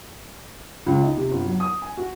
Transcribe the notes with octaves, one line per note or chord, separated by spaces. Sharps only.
C#2
D#4
C3
G1
F#3
D#6
G#5
F#4